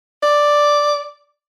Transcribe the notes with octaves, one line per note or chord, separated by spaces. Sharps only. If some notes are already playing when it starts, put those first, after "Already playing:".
D5